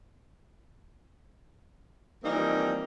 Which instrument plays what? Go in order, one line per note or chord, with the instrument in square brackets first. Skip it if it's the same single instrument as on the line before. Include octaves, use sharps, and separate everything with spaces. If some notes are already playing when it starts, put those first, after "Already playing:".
[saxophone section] E3 F3 G3 A#3 C4 D#4